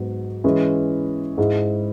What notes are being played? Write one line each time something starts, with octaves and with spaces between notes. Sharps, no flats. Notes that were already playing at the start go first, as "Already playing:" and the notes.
Already playing: G#2 F#3 B3
E3 G#3 C#4 E4
G#2 G#3 E4